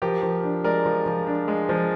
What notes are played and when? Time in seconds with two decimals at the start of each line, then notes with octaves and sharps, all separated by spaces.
0.02 F3 G4 A#4
0.23 F3
0.43 D4
0.64 G#3 A#4 D5
0.85 F3
1.06 F3
1.27 D4
1.48 G#3
1.69 F3